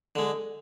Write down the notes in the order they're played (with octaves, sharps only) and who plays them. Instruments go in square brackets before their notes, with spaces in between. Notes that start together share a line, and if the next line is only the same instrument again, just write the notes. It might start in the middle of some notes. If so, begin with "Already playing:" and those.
[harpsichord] D3 G#3